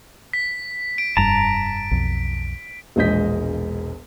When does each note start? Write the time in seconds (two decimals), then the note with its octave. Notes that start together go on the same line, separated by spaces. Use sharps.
0.33 B6
0.98 D7
1.17 F1 G2 A5 A#5
1.91 B1 F2
2.96 E1 A#1 G#3 D#5 G6 B6